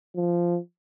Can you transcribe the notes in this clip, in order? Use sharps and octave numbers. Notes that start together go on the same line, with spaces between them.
F3